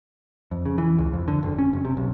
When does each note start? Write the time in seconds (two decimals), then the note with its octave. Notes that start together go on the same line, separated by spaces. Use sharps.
0.51 F2
0.65 C#3
0.78 E3
0.98 C#2
1.13 F2
1.28 D3
1.43 F#1
1.59 C#4
1.73 F#1
1.85 C3
1.97 B1